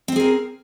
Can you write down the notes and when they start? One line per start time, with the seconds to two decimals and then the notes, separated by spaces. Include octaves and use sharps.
0.08 C4
0.12 C5
0.16 G#4
0.20 A#4